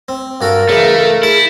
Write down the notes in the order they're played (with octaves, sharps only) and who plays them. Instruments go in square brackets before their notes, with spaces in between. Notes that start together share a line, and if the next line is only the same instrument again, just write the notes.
[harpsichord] C4
[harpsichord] G2 F#4 A4 [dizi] A#4
[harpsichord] C#3 E3 [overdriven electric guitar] A3 [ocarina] G#4
[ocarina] A4
[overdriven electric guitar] E4 [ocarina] G#4 [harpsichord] A5